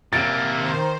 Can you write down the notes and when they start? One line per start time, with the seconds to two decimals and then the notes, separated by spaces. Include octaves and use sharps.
0.13 C3 A#3 A6 D7
0.52 D#3 C5